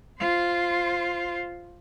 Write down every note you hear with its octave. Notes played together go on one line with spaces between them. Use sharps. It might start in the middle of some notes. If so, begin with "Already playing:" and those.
F4 C5